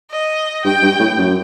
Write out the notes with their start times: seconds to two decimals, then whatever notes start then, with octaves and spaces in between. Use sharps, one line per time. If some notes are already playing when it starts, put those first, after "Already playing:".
0.11 D#5
0.64 G2 G5
0.83 G2
1.00 A2
1.18 F#2